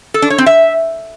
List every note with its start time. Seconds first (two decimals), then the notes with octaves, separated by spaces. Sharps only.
0.14 A4
0.22 D4
0.30 C#5
0.38 C4
0.46 E5